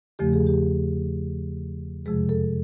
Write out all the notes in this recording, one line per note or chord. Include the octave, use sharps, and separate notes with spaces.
E2 C#3 F3 A3 G4
G#4
G4
F2 C3 F3 G#3 G#4
A4